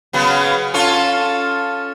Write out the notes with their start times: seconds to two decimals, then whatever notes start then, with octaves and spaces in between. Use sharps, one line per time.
0.13 C#3 F#3 B3
0.74 C#4 F4 A4